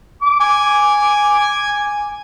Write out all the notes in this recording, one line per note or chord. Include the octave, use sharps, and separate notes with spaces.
D6
G#5